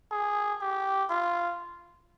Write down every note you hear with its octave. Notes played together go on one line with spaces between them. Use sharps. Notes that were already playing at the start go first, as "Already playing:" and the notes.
G#4
G4
F4